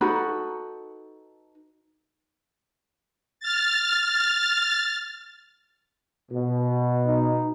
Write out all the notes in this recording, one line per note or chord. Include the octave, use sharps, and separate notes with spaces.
D#4 F#4 A4 B4
F6 A6
B2
D#4